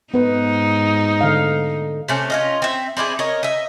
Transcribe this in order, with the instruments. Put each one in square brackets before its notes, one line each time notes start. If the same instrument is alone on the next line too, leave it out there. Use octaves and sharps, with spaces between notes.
[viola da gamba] G#2 D#4 [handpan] B3 B4
[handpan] D3 F5
[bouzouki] C3 A3 C#4
C#4 F4 D#5
C4 E5
C4 D4 E4 G#4
A#4 C#5 D#5
D#5 E5